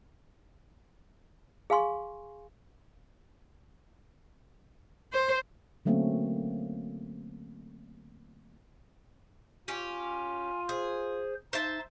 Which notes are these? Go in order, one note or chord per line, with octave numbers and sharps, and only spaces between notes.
G#4 F5 G#5 C6 C#6
C5
D3 F#3 A3 A#3 C4 C#4
C#4 F4 G4 G#5
G#4 C5
D#4 C5 E5 A5